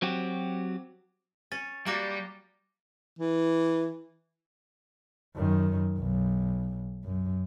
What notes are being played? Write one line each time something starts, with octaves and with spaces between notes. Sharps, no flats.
F#3 C4 F#4 G4
C#4 A6
G3 A#3 F#4 D6 A#6 G7
E3
F#2 D#3
B1
F#2